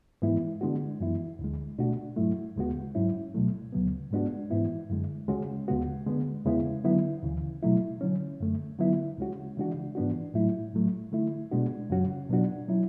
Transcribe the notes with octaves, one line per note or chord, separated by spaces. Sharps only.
G#2 E3 G#3 B3 E4
D3 G#3 B3 D4 F#4
F#2 E3 B3 E4
D2 D3 G#3
B2 A3 D4 F#4
G#2 F#3 A3 E4
D2 C#3 G#3 B3 F#4
G#2 F#3 C#4 E4
C#2 B2 F#3 A3
D2 C#3 F#3 B3
G#2 G#3 B3 D4 F#4
G#2 E3 B3 E4
F#2 D3 G#3
C#2 C#3 G#3 C#4 F#4
D2 C#3 G#3 B3 F#4
D3 G#3 B3
E2 C#3 G#3 B3 E4
D3 F#3 B3 E4
D2 C#3 E3
B2 F#3 A3 E4
D3 F#3 C#4
F#2 D3 A3
D3 F#3 B3 E4
C#2 C#3 G#3 C#4 F#4
C#3 E3 G#3 D4 F#4
G#2 E3 B3 D4 F#4
A2 F#3 A3 E4
A2 F#3 A3
D3 A3 E4
B2 G#3 B3 D4 F#4
F#2 C#3 F#3 C#4 F#4
B2 F#3 B3 D4 F#4
F#3 C#4 E4